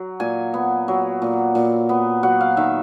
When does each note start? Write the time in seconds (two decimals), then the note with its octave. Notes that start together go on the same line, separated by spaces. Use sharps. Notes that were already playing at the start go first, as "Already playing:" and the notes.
Already playing: F#3
0.20 A#2 G#5
0.54 B3
0.88 F#3
1.22 A#2
1.55 A#2
1.89 B3
2.23 F#3 F#5
2.41 F5
2.57 D#3 E5